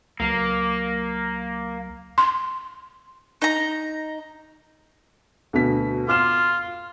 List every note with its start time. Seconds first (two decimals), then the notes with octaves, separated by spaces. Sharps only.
0.20 C#2 F#3 A#3 C7
2.18 C6
3.42 D#4 A#5
5.53 D2 B2 B6
6.09 F4 D6 F6 E7